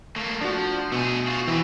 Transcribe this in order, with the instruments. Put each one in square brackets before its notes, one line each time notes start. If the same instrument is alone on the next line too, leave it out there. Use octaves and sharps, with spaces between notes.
[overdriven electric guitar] A3 A#3
[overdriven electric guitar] F3 [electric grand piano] D4 F#4
[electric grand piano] G6
[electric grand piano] B2 [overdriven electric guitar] A3 G#4
[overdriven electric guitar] F4 F#4
[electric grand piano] E3 [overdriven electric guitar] C4 B4